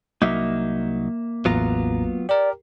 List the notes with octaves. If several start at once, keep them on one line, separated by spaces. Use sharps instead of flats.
C2 F#3 A#3 D#4 E5
A1 E2 F#3 B3 F4 A#5
G4 A#4 D5